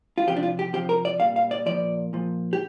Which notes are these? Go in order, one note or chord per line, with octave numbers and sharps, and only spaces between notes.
F4
C3 F3 G4
D4
F4
G4
C3 F3 G4
A#4
D5
A#2 G3 F5
F5
D5
A#2 F3 D5
A#2 F3
G4